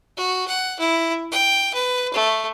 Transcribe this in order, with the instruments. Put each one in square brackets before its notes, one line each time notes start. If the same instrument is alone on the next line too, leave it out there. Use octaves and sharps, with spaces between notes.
[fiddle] F#4
F#5
E4
G5
B4
A3